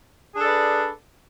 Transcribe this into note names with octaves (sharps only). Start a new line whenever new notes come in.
D4 G#4 A4 B4 D5